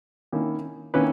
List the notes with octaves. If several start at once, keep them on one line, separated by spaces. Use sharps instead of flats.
D#3 A#3 C#4 E4
D#3 A#3 C#4 E4 B4